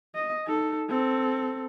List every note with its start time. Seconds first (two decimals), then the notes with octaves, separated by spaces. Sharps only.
0.15 D#5
0.46 D#4 A4
0.89 C4 A4